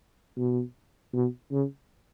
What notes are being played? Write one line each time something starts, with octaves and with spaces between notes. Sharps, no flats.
B2
B2
C#3